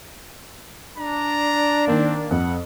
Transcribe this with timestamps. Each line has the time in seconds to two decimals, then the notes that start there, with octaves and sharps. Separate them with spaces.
0.98 D4 A#5
1.87 D#3 A#3 C4
2.31 F2 F#5